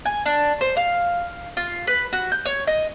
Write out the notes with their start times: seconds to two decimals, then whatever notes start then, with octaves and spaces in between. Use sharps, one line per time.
0.05 G#5
0.26 D4
0.61 C5
0.77 F5
1.57 F4
1.87 B4
2.13 F#4
2.32 G6
2.45 C#5
2.67 D#5